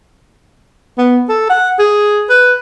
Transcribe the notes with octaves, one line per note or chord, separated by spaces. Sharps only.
B3
A4
F#5
G#4
B4